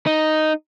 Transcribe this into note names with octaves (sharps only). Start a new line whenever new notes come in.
D#4